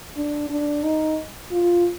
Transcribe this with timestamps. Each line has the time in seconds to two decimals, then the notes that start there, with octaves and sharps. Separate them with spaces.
0.17 D4
0.50 D4
0.84 D#4
1.52 F4